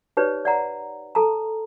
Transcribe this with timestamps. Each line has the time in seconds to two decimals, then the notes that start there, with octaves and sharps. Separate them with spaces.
0.17 D#4 G4 B4 C#5 D5
0.45 D5 F#5 A#5
1.15 A4 A5 A#5